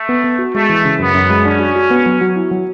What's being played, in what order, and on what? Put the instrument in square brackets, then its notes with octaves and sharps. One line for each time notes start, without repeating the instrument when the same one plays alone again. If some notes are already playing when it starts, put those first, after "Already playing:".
Already playing: [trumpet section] A3
[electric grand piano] B3
B3
F#4
[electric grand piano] G#3 [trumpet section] A3
[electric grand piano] E3
C#3
[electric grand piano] F#2 [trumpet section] B3
[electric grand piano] F#2
G#3
[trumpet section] C#4 [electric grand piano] D4
[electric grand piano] F#4
F#4
B3
F#3
F#3
E4
F#3